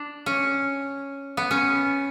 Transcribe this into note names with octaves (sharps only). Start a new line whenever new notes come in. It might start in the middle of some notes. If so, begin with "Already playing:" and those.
Already playing: D4
C#4
B3
C#4